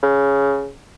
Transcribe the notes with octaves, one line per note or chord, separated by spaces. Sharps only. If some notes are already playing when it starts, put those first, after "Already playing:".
C#3